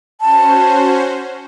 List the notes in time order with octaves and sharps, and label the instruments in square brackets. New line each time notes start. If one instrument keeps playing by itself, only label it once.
[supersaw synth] C#4 F#4 C5 [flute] A5